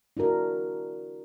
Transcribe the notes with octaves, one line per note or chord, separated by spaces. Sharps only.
D4 E4 F#4 A#4